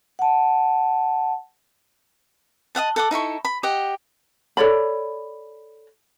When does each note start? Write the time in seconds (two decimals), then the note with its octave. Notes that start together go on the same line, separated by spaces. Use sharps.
0.19 F#5 A5
2.75 D#5 F5 F#5 A5
2.96 A4 F#5 D6
3.11 D#4 E4 A4 C#6
3.45 B5
3.63 G4 D#5 F#5
4.57 A4 C#5 D5 B5